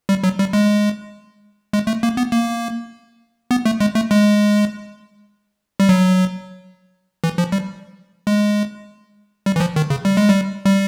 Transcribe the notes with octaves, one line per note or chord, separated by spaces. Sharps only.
G3
F#3
G3
G#3
G#3
A3
A#3
B3
A#3
B3
A3
G#3
A3
G#3
G3
F#3
E3
F3
G3
G#3
G3
E3
F3
D#3
C#3
G3
G#3
G3
G3